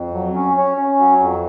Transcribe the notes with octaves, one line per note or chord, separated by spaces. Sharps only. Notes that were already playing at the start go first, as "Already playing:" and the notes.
Already playing: F2
F#3
C#4
C#4
C#4
F#3
F2